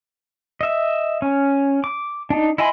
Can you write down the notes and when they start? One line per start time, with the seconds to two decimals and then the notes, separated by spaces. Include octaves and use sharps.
0.61 D#5 E5
1.22 C#4
1.84 D6
2.30 D4 D#4
2.58 E4 D#5 G#5 B5 C6